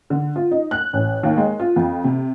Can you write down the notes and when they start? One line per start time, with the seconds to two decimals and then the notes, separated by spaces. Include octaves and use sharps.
0.10 D3
0.36 F4
0.51 D#4
0.71 F#6
0.93 A1
1.23 D#2
1.37 G#3
1.60 F4
1.76 F2
2.04 C3